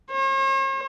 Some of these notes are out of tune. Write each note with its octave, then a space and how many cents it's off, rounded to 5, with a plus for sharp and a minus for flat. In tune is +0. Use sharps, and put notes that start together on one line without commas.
C#5 -45